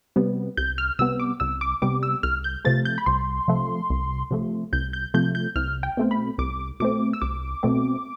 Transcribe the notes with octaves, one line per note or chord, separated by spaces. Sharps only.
C3 G3 B3
C2 G6
F6
C3 G3 B3 E6
D6
C2 E6
D6
C3 G3 B3 D6
E6
C2 F6
G6
C3 F3 A3 A6
G6
B5
C2 C6
C3 F3 A3
C2
C3 F3 A3
C2 G6
G6
C3 F3 A3 G6
G6
C2 F6
G5
B2 A3 C4
B5
C2 D6
B2 A3 C4 D6
E6
C2 D6
B2 A3 C4